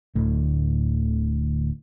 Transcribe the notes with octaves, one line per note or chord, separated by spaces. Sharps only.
D1 D2 A2